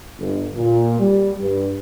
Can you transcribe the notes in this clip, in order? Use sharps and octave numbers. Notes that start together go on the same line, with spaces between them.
G1
A#2
G3
G2